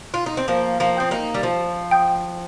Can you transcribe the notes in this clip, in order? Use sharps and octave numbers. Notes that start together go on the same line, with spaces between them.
F4
D#4
C4
F3 A#3 C5
F3 A#3
C4 G5 D#6 G6
A#3 D#4
G3
F3 C5
G5 D#6 G6